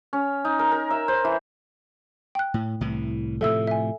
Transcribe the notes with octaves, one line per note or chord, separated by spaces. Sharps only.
C#4
D#4
A#4
A#4
E5
C5
E3
G5 F#6
A2
C2 A2 E3
A2 C3 F3 A4 E5 E6
E5 G#5